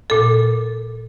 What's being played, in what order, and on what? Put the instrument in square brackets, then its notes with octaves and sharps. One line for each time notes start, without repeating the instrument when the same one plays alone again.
[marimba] A#2 A4